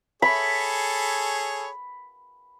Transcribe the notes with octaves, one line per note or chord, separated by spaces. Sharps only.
G#4 A4 C#5 B5